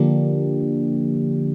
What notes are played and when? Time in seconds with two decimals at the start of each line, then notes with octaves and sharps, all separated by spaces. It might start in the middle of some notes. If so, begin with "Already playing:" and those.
Already playing: D3 F3 A#3 D4 G4